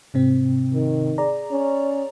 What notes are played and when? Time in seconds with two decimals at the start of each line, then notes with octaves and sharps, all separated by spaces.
0.14 G#2 C3 C4
0.74 D#3
1.18 G#4 D5 A#5
1.51 C#4